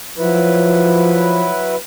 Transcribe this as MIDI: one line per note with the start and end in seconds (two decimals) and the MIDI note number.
0.18 1.52 53
0.18 1.76 54
0.18 1.76 64
0.18 1.76 71